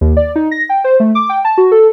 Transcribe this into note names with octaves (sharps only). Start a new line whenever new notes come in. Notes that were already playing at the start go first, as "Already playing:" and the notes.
D#2
D5
D#4
A#6
G5
C5
A3
D6
G5
A5
F#4
A4